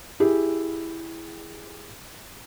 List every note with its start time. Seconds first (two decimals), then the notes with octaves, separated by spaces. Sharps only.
0.20 E4 G4 G#4